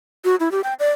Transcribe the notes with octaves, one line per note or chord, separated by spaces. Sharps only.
F#4
E4
G4
G5
D5